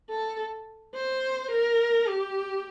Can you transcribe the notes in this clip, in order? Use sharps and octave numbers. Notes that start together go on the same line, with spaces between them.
A4
C5
A#4
G4